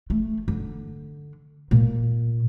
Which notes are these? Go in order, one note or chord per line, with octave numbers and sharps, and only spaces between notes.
A3
D3
A#2